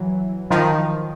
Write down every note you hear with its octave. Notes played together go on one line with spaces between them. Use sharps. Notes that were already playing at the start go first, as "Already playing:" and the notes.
Already playing: E3 F#3
D#3 F3